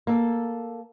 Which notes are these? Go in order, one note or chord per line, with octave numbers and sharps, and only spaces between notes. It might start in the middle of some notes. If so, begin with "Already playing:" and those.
A#3 A4